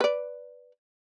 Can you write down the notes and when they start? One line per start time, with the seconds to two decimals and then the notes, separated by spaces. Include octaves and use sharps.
0.01 B4 D5